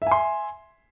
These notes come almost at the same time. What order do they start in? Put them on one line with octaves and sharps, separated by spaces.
E5 G#5 C6